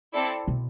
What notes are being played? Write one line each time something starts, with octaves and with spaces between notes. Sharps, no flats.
C4 E4 A4 D5
B2